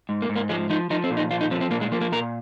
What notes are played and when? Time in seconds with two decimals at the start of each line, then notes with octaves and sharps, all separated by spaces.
0.09 G#2
0.22 A#3
0.29 G#2
0.36 A#3
0.49 F3 G#3
0.70 F3 D#4
0.90 F3 D#4
1.04 C4
1.11 A#2
1.17 D#4
1.31 F3 F4
1.41 D#4
1.51 F3 C4
1.61 C4
1.71 A#2 A#3
1.81 G#3
1.91 F3 A#3
2.01 A#3
2.12 A#2 A#4